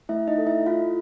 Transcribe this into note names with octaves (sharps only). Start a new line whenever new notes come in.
A3 E4 E5
D#4 D#5
A4
E4 E5
E4 F4 F5